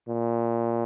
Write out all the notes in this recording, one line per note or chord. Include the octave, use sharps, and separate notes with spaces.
A#2